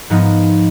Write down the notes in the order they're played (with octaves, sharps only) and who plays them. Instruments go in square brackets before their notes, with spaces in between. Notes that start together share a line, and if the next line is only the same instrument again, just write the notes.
[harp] G#2 F3 B3 D#4